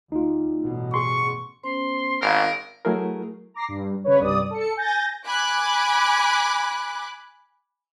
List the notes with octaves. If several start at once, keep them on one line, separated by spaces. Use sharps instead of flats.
D2 D#4 F4
A1 G2 B2
G#4 C6 C#6
B3 C#4 C5 C6
G#1 A#4 F5 A#5
F#3 A3 E4 G#4 A#4
A#5 D6 A#6 C7
G2
C#3 B4 C#5
C2 G2 D5 D#6
A4 C#7
G#5 G6 A6 A#6
G#5 B5 D6 F#6